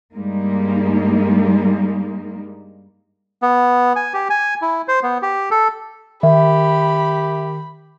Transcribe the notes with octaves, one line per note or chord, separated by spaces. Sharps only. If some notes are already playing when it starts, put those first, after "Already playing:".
G2 G3 G#3 A#3 D#4
B3
G#5
G4
G#5
E4
C5
B3
G4
A4
D#3 G4 E5 B5